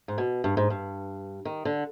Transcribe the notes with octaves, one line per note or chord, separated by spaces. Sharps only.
G#2
B2
G2
G#2
G2
D#3
D3